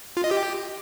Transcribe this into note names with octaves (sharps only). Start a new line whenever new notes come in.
F4
D#5
G4